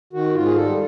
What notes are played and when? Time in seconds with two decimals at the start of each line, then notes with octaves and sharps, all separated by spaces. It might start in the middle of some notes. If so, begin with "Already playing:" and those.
0.13 D#3 F#4
0.34 G#2 F4
0.45 G#4
0.56 G3 A4